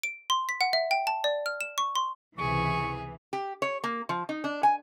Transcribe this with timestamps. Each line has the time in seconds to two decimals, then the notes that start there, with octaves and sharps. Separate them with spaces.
0.03 D7
0.30 C6
0.49 B6
0.61 F#5
0.73 E5
0.91 G5
1.07 A5
1.24 D5
1.46 F6
1.61 E7
1.78 C#6
1.96 C6
2.39 C#2 C3 E3 G#4 C#6
3.33 G4
3.62 C#5
3.84 A#3
4.09 F3
4.29 D#4
4.44 D4
4.63 G#5